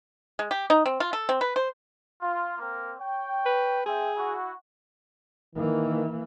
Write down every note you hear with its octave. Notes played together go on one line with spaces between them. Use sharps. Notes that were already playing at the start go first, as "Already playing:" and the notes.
G#3
G4
D#4
C4
F4
A4
C4
B4
C5
F4
A#3 C4 A#4
C#5 G5
B4
C4 G#4 E5 G5
E4 F#4
D#3 E3 A#3